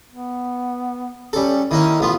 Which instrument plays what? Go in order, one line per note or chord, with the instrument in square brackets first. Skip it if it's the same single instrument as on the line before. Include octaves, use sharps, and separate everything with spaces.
[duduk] B3
[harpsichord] G3 A4 [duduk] C#4
[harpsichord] D#3 A#3 C#4 [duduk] E4
[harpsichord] A1 B3 F4